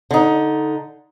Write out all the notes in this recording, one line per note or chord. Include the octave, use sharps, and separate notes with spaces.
D3 D#4